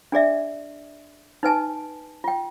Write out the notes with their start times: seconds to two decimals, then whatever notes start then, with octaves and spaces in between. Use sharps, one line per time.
0.12 D4 G#4 D5 E5
1.43 D#4 B4 G#5 A5
2.24 F4 G5